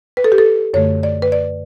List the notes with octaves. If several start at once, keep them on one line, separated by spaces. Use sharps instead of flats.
B4
A4
G4
A4
F#2 D3 A3 C#5
D5
B4
D5